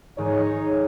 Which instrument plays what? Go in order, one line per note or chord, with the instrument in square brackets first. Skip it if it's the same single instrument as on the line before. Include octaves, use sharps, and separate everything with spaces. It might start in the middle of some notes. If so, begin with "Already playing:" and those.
[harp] G#2 D#3 [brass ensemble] D#4 G#4 C#5